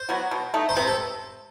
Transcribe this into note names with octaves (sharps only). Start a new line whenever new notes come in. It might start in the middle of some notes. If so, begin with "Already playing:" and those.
Already playing: C5
F#3 B3 F#4
B2
A3 D#4
C5
C3 B4
A4